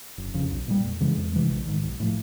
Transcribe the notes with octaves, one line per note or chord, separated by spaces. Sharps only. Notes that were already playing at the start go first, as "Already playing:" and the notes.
F#1
F2 C#3
B1
A#2 G3
F2
C#3 E3 G#3
F2
C3 E3 G#3
A#1
G#2 D#3
B1
A2 F3